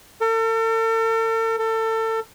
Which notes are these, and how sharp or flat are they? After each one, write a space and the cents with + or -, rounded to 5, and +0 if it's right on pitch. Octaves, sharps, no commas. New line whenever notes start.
A4 +45
A4 +30